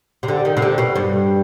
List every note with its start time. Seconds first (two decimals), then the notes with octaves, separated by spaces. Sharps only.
0.23 C3
0.28 D3
0.45 D#3
0.57 C3
0.62 D3
0.78 B2
0.96 G2